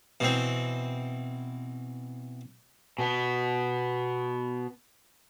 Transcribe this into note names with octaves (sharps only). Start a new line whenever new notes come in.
B2 E3 C4
B2 B3